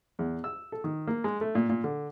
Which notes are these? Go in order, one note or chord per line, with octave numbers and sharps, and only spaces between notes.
E2
E6
A4
D#3
A#3
G#3
A3
A#2
A#2
D3